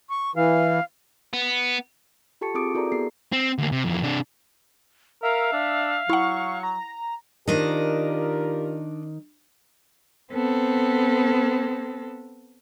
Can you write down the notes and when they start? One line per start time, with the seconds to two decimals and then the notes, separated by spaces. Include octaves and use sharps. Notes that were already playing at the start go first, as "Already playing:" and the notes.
0.09 C#6
0.36 E3 F5
1.33 B3
2.41 F4 G4 A4 A5 C#6 C#7
2.54 C4 F4 G#4 D6 D#6 D7
2.74 E4 F#4 A4 A#4 D5 A#5
2.92 B3 G#4 C7
3.32 C4
3.58 D2 A#3
3.72 C3
3.85 F2 E3
4.02 C3 D4
5.23 A#4 E5 F5
5.53 D4
6.09 F#3 E4 F#5 C#6
6.63 A#5
7.48 D#3 D4 F4 G4 A#4 C5 D#5
10.33 B3 C4 A4